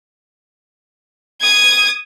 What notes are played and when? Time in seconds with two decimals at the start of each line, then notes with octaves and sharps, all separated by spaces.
1.41 D#6 G#6